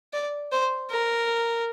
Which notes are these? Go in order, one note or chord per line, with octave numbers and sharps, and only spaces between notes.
D5
C5
A#4